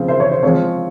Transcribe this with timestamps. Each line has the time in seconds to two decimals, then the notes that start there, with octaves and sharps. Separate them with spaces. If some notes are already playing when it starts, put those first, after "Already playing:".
Already playing: C#3 F3 C4
0.08 C5 E5
0.20 C#5
0.31 C5
0.43 F3 G#3 C4 C#5